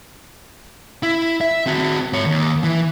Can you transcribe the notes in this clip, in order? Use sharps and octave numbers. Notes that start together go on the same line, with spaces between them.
E4
E5
C4 F#4
G#2 C#5
D#2
E3